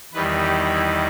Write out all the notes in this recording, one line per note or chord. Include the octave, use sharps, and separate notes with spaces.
E2 D#3 G3 B4
G4
E4